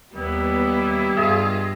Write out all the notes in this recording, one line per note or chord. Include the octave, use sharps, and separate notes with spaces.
D#2 G3 B3 E4
G2 F4 G#4 D#5 E5